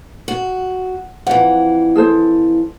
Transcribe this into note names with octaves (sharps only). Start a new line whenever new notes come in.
F#4
F2 E3 F#5
G#4 A4 C5